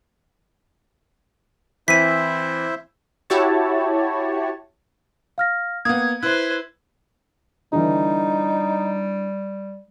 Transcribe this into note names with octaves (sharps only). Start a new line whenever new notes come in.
E3 C4 E4 C5 E5 B6 D#7
E4 F#4 G4 C#5 A5
F5 F6 A#6
A#3 B3 D#6 G#6
E4 B4 C5 F#6
D3 E3 G3 D#4